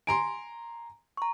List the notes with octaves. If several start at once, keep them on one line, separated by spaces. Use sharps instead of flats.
G#5 A#5 C6 D7
A#5 C#6